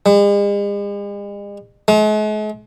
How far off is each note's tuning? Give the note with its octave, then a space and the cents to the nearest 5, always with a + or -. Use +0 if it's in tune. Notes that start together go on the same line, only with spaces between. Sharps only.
G#3 -45
G#3 +45